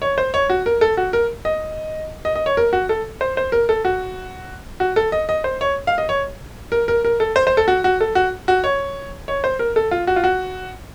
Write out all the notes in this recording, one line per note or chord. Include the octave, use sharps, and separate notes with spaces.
C#5
C5
C#5
F#4
A#4
A4
F#4
A#4
D#5
D#5
D#5
C#5
A#4
F#4
A4
C5
C5
A#4
A4
F#4
F#4
A4
D#5
D#5
C5
C#5
F5
D#5
C#5
A#4
A#4
A#4
A4
C5
C5
A4
F#4
F#4
A4
F#4
F#4
C#5
C#5
C5
A#4
A4
F4
F#4
F4
F#4